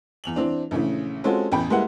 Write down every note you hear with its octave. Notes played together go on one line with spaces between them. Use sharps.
E2 F7 F#7
E3 C4 D4
A#1 C#3 E3 A3
G#3 C4 C#4 F4 F#4 A4
A1 E2 G5 B5
G3 G#3 A#3 E4 B4 F#5